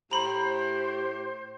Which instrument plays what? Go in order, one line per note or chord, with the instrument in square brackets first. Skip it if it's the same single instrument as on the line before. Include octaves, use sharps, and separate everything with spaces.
[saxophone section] A2 G4 [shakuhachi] C5 [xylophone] A#5 B5